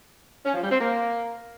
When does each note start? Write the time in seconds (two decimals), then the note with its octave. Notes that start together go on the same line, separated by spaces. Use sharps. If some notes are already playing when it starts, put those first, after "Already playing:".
0.45 C#4
0.54 F3
0.62 G3
0.70 C4
0.79 A#3